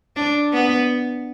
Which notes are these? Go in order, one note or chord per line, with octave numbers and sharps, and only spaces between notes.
D4
B3